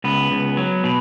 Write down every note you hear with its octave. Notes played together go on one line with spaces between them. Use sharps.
C#2 B3
C#2
F#3
B2